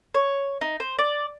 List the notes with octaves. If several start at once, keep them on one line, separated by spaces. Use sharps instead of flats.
C#5
D#4
C5
D5